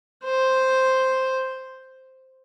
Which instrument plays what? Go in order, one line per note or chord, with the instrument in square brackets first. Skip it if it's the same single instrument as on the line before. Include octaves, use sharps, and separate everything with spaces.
[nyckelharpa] C5